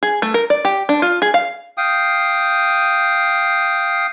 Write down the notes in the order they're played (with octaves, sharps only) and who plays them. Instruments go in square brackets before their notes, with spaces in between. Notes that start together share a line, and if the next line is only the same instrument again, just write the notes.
[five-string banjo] G#4
A3
A#4
D5
G4
D4
F4
G#4
F5
[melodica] F5 G5 D#6